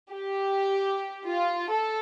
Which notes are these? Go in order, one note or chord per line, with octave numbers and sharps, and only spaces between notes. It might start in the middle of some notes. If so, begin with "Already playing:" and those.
G4
F4
A4